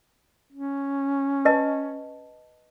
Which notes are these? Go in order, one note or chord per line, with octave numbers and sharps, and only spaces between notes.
C#4
B4 D#5 A5